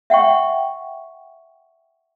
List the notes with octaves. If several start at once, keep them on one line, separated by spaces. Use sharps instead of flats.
E5 F#5 G5 C#6